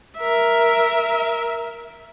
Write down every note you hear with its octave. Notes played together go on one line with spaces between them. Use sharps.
A#4 E5